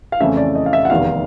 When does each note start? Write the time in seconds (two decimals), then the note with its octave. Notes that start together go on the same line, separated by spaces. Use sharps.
0.12 F5
0.20 F2 C#3 E3 A3 C#4 E5
0.37 D5
0.55 D#5
0.66 F5
0.73 E5
0.85 F#5
0.90 F1 E2 C3 D#3 F5